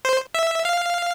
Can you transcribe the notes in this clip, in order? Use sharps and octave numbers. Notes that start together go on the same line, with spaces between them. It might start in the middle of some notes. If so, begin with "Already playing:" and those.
C5
E5
F5